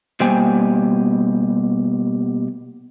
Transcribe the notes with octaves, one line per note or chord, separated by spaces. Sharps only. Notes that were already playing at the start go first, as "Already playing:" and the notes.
B2 G3 A#3 C5 G5 G#5